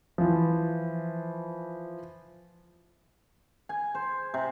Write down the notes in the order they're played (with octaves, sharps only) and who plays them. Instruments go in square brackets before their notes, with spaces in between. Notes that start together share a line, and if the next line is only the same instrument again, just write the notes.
[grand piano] E3 F3
[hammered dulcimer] G#5
C5
C3